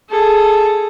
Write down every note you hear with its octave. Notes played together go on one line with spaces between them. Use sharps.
G#4 A4